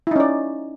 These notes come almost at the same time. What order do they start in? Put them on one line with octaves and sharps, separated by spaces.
E4 D#4 C#4 D5